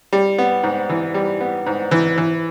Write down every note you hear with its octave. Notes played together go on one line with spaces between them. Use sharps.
G3
B3
G#2
E3
G3
B3
G#2
E3
E3